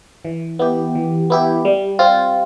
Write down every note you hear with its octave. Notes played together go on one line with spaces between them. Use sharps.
E3
B3 E4 G4
E3
B3 E4 G4
G3
C4 F4